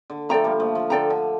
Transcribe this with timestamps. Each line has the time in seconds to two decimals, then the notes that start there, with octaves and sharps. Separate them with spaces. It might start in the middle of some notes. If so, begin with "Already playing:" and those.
0.10 D3
0.29 F3 A3 A4 D5 G5 A#5
0.44 G3 A#3
0.60 F3 A3
0.75 F3
0.90 D3 A4 D5 G5 A#5
1.10 D3